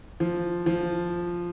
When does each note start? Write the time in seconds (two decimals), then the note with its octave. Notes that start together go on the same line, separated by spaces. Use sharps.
0.20 F3
0.66 F3